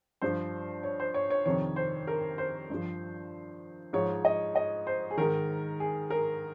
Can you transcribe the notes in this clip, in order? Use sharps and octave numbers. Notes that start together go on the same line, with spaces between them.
G2 F3 C5
C#5
C5
C#5
C#5
F2 C3 D#3 C#5
C5
A#4
C5
G2 F3
G#2 F3 C#5
D#5
D#5
C5
G#4
G#2 D#3 A#4
G#4
A#4